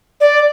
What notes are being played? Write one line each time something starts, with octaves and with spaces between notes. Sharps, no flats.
D5